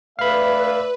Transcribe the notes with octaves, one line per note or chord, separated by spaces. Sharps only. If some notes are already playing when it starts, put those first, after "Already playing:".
A3 B4 D5 E5 F5 B5